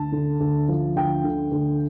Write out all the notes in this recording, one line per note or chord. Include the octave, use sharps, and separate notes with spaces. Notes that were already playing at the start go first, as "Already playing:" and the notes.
Already playing: D2 A5
D3
D2
F3
D2 G5
D3
D2